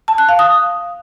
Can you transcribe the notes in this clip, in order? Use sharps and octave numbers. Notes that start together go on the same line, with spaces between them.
A5
F#6
F5
D#6